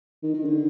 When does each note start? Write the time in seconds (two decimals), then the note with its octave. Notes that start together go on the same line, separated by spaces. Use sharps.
0.23 D#3
0.34 D#3
0.45 D3